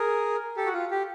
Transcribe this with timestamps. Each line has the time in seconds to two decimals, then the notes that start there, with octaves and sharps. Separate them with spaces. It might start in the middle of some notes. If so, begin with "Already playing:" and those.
Already playing: G#4 A#4
0.57 G4 A4
0.66 F#4
0.73 F4
0.91 G4